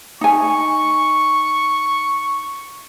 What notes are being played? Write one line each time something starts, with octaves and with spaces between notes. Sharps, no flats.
D#4 G#5 C#6